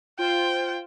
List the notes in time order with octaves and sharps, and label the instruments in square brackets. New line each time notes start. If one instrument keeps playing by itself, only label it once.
[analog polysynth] F4 C5 [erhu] G5